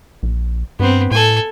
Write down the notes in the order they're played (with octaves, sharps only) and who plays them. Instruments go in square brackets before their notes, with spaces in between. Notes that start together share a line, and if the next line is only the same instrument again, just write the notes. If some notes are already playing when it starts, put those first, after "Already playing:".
[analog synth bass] A#1
[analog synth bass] G2 [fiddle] B3 C4
[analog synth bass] A2 [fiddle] A4 G#5